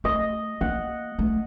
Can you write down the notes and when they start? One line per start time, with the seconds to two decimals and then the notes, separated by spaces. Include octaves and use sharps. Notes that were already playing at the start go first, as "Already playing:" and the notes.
0.04 A3 D#5
0.61 A#3 F#5
1.19 A3